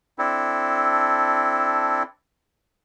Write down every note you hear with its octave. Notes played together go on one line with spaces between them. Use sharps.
C4 D4 E4 A4